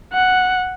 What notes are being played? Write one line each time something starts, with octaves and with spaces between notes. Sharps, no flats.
F#5